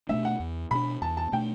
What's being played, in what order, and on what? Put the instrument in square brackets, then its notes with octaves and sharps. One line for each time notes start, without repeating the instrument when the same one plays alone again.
[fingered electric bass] B2 A3 D4 [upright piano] E5
[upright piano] F#5
[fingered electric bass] E2
[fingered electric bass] B2 A3 D4 [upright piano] B5
[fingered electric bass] E2 [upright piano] A5
[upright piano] A5
[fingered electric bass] B2 A3 D4 [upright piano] G5